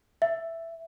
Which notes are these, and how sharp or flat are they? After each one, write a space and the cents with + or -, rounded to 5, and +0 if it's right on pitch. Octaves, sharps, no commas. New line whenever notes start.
E5 +5